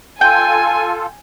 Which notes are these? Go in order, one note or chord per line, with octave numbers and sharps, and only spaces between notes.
F4 A4 G5 G#5